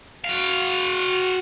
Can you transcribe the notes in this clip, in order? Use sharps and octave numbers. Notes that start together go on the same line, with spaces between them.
F#4 F5